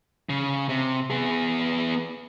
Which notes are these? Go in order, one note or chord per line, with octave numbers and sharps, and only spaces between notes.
C#3
C3
B3 G#4